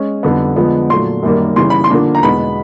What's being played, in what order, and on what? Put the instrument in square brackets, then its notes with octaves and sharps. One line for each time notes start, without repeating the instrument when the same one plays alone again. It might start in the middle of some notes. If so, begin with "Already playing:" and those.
Already playing: [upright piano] G#3 C#4
F2 D3 G3 B3
D3 F3 G#3 B3
A#2 F#3 A3 C6
F#2 D#3 G3 A#3
C#3 E3 G3 C6
B5
C6
D3 F3 A#3 D4
A#5
E2 B2 G#3 B3 B5